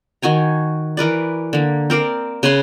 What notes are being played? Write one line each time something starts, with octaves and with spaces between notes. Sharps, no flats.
D#3 F#4 G#5 A#5
E3 A#4 B4 D5
D3 A#3
C4 A#4 D5 F5
C#3 B4 G#5 C6